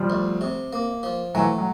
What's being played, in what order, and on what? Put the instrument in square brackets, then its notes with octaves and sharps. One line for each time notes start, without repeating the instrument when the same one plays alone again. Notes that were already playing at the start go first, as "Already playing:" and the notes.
Already playing: [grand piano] F3 G3
[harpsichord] D2
C3
A#3
F3
[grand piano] E3 F#3 [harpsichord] A3
[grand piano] F#3